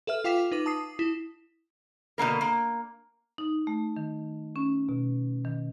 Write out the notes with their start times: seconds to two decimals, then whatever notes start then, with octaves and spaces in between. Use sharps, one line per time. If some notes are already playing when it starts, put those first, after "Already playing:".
0.07 A4 B4 E5 F6
0.24 F4 F5 G5 D6 B6 E7
0.52 D#4 B4 D6
0.66 A5 D#6 C7
0.99 E4
2.18 B2 D3 A#3 A#4
2.41 A#3
3.38 D#4
3.67 A3
3.97 D#3
4.56 C#4
4.89 B2
5.45 D#3